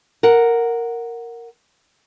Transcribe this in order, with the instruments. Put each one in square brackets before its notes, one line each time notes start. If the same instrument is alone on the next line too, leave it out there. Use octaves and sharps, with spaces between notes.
[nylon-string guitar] A#4 F#5